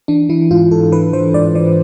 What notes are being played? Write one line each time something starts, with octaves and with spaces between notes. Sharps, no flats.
E3 D4
E3 E4
G#2 F4
G#2 A4
E3 B4
E3 C5
G#2 D5
E3 D5